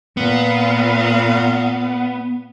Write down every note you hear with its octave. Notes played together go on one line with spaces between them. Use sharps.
A#2 B3 F5